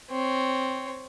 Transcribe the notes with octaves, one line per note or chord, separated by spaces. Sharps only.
C4 C#5